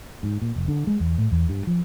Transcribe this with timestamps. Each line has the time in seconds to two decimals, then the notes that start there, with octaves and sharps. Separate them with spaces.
0.23 G#2
0.42 A#2
0.56 F1
0.68 D3
0.87 G#3
1.00 E2
1.18 A2
1.32 E2
1.49 G2
1.67 F3